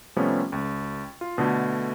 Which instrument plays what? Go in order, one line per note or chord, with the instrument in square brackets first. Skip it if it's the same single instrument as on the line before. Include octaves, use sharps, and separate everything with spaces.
[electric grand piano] C3 F3 G3 A3 B3 C#4
C#2
F4
B2 D3 A3